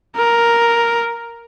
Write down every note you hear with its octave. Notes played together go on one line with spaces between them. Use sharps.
A#4